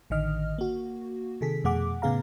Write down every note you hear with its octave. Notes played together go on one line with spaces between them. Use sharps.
A1 D3 D#3 D#5 F6
A#3 F#4
C3 D#3 G#4 A4 B6
F2 B2 A3 G#4 F#5 D6
A2 C#3 B3 G#4 F5 A#5